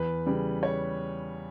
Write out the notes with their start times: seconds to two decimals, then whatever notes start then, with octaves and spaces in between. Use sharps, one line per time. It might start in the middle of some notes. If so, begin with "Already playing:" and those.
Already playing: E2 B4
0.26 C#3 G3
0.63 C#5